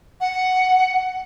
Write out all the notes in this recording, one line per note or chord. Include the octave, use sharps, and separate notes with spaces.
F#5